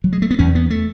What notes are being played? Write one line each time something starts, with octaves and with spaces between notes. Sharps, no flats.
F#3
G#3
A3
B3
E2 C#4
B3
A3